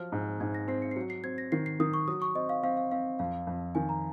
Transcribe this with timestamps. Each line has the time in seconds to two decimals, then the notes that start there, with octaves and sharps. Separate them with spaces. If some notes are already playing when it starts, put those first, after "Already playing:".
Already playing: F3 F#3 F6
0.12 G#2
0.40 G#2 G#6
0.55 A#6
0.68 C4 C7
0.82 C#7
0.91 C7
0.96 F#3 C#7
1.10 C7
1.24 C4 G#6
1.38 A#6
1.52 D#3 C7
1.66 C7
1.80 D#3 D#6
1.94 C#6
2.08 F#3 D#6
2.22 C#6
2.35 C4 D#5
2.49 F5
2.63 C4 F5
2.77 F5
2.91 C4 F5
3.19 F2 F5
3.47 F2
3.75 D#3 G#5
3.89 A#5